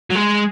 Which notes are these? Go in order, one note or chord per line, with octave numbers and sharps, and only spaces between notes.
F#3
G#3